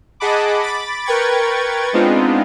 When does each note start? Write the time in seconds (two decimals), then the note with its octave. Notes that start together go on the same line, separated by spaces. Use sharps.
0.20 G#4 D#5 F#5 A5 B5 D6
0.63 B5 D6 A6
1.05 A#4 B4 G5 C#6 G#6 A6
1.93 G#3 B3 C4 D4 D#4 F4